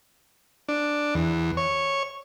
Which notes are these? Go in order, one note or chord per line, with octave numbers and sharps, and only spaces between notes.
D4
E2
C#5